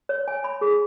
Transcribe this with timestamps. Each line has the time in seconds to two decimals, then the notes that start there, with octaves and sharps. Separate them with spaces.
0.09 C#5
0.28 G#5
0.44 B5
0.61 G#4